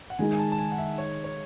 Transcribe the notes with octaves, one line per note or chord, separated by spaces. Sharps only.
F#5
D#3 G#3 D#4 G#5
G#5
A5
A5
G#5
F#5
E5
C#5
C#5